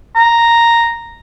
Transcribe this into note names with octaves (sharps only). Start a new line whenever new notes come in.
A#5